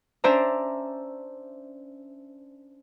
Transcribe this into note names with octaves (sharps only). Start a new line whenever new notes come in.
C#4 D4 C5 D5 E5 A#5